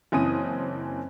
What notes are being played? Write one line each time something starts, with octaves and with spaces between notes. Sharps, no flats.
F#1 E3 C4 C#4 D#6 D#7